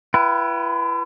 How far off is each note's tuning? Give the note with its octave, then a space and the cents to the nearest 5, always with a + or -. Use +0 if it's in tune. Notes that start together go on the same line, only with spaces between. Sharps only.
E4 +40 B4 -15 G5 -30